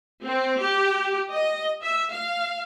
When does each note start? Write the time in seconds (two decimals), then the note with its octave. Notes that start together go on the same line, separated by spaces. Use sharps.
0.23 C4
0.60 G4
1.30 D#5
1.82 E5
2.12 F5